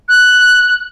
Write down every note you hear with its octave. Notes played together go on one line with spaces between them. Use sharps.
F#6